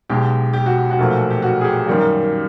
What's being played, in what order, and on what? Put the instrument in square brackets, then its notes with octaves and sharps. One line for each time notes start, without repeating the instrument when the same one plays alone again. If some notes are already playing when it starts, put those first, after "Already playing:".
[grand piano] B1 B2 G#3 G4
G4
F#4
F#4
B1 A#2 F3 A3
G4
F#4
G#4
G4
F#2 D#3 G3 A#3